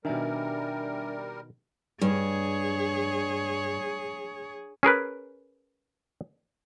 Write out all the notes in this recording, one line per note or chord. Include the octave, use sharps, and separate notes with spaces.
B2 D#3 G3 D4 A#4 E5 G#5
G2 G#4 C#5
C#4 G#4 A#4 B4